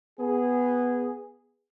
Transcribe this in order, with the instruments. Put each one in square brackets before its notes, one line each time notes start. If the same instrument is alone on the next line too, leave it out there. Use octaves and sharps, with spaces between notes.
[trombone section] B3 G#4